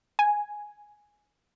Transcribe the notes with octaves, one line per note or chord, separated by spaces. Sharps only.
G#5